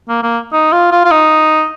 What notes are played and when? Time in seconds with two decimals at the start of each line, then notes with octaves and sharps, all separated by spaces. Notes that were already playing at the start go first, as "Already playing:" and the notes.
0.09 A#3
0.23 A#3
0.53 D#4
0.73 F4
0.92 F4
1.05 F4
1.11 D#4